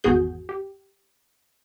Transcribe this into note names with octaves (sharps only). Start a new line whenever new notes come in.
G#1 E2 B3 F#4 G#4 G6
G4